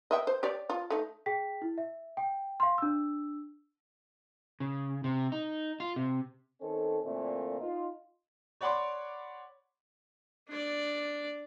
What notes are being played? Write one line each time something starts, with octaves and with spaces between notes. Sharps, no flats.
D#5 E5 G5
C5
G4 C#5 D5
F4
A3 D#4
G#4 G5 B6
E4
E5
G5
F5 C6
D4 E6
C#3
C3
D#4
F4
C3
D#3 C4 C#4 A4
A#2 D3 E3 A3 A#3 C4
D#4 F4
C#5 D5 F#5 B5 C6 D6
D4 D5